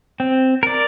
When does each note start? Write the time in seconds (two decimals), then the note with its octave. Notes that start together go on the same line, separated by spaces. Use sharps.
0.20 C4
0.63 A#4 D5